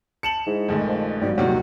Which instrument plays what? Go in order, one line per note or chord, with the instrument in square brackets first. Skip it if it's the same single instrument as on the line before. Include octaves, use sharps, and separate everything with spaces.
[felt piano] A5 [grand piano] C#7 E7 F#7
[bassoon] G#2 [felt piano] G#3 E4
[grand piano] A#1 F2 [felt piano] D#3 G#3 A3
[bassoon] F3
[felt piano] G#1 F#3 [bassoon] G3
[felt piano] D#1 E2 F#3 [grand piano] C3 D#3 [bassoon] F#4